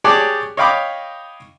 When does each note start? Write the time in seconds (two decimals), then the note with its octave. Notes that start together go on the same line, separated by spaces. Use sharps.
0.04 G4 G#4 C#5 D5 A5 F#6
0.57 C#5 D#5 F5 G5 B5 D6